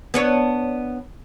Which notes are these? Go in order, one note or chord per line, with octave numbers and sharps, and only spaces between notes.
B3 D4 C#5